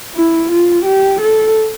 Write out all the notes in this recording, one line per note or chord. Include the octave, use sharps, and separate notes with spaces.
E4
F4
G4
A4